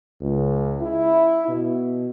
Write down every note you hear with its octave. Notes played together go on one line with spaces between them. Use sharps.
C#2
E4
B2